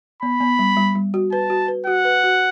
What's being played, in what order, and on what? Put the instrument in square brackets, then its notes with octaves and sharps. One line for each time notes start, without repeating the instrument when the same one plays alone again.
[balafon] B3 [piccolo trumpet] B5
[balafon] B3
G3
G3
G3
F#4
[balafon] B4 [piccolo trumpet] A5
[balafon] F#4
B4
[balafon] F#4 [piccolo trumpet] F#5
[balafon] B4
F#4